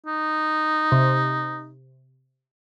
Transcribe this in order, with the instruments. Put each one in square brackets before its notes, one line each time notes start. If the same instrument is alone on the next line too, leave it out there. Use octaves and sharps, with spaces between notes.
[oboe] D#4
[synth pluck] C3